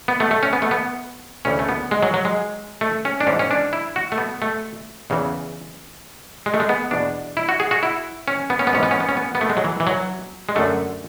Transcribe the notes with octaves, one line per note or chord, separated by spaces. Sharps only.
B3
A3
A3
C#4
B3
A3
B3
D2 C#3 E3 C#4
A3
B3
G#3
F#3
F#3
G#3
A3
C#4
D4
G#2 E3 C#4
C#4
D4
E4
F#4
A3
B3
A3
E2 C#3 E3
G#3
A3
G#3
B3
E2 B2 D4
E4
F#4
G#4
F#4
E4
C#4
B3
C#4
B3
G#2 E3 C#4
B3
C#4
B3
C#4
B3
B3
A3
G#3
F#3
E3
E3
F#3
G#3
F#2 D3 A3